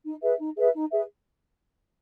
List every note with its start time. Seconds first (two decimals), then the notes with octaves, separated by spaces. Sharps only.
0.05 D#4
0.22 G#4 B4 E5
0.40 D#4
0.57 G#4 B4 E5
0.74 D#4
0.91 G#4 B4 E5